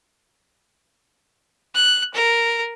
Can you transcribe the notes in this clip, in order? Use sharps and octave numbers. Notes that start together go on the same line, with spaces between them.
F#6
A#4